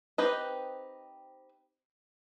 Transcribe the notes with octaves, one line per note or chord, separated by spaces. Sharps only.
C4 D#4 G4 B4 D#5